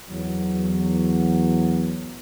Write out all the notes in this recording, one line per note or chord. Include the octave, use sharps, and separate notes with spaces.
E2 F#3